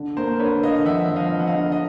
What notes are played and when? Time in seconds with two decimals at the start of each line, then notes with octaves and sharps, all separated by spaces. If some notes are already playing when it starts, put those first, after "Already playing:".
Already playing: D3
0.17 A#3 A#4 C5
0.39 D3 B4 C#5
0.63 D3 D#5 F5
0.85 F3 E5 F#5
1.08 F3
1.16 D#5 F5
1.32 F3
1.39 F#5
1.47 D#5 F5
1.55 D3
1.72 D#5